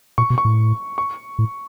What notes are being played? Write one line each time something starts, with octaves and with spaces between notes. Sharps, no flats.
A#2 C#6
B2
C#6
A2
C#6
A2